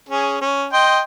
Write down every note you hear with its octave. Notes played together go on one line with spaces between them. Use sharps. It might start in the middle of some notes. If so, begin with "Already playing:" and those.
C#4 G#4
C#4
D#5 G5 C6